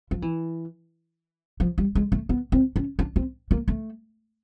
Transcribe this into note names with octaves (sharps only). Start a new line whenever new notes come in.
F3
E3
F3
G3
G#3
A3
B3
C4
C#4
D4
C4
A#3
A3